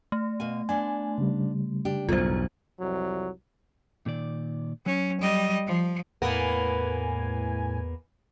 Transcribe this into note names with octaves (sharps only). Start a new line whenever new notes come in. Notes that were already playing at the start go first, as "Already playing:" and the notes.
A3
B2 F5 G#5
B3 D4 G#5
C#3 G3
D4 G4
B1 E2 G2 A3 F4 C5
C2 F2 F#3
A#2 D#3 D5
F#3 C#4
G3 D#5
F3
E2 A2 A#3 B3 A#4 G#5